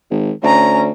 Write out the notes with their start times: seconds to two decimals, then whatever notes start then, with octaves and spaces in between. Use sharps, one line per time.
0.11 G#1
0.43 D2 C#4 A#5